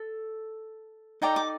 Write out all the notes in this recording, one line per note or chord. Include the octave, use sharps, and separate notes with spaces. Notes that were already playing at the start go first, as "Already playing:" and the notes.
Already playing: A4
D#4 A4 D5 G5 A#5
D6